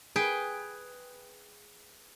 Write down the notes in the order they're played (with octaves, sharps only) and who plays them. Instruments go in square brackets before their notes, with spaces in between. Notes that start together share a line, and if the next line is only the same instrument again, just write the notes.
[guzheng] G#4 B4 G5